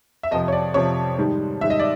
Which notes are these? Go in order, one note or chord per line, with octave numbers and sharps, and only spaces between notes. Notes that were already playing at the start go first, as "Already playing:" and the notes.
E5
F2 C3 F3 D#5
C#5
D5
F2 C3 F3 C#5
G#2 D#3 G3
G#2 D#3 G3 E5
D#5
D5